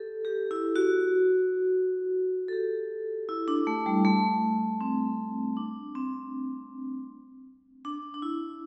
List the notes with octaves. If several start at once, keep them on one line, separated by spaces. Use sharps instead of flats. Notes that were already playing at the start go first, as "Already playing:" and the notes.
Already playing: G4 A4
G4
E4
F#4
A4
G4
E4
D4
A3
G3
A3
C4
D4
C4
D4
D4
E4